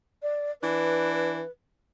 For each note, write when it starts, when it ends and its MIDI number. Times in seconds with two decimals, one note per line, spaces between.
0.22 0.52 74
0.62 1.42 52
0.62 1.42 62
0.62 1.50 71